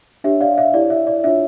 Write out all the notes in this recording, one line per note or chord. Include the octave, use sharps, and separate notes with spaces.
D4 G4 C#5 E5
D5 F5
E5
E4 G4 C#5 D5
E5
D5
D4 F4 C#5 E5